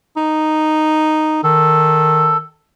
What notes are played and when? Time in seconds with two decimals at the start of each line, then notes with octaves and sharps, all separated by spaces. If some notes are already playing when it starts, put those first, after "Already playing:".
0.17 D#4
1.44 D#3 A4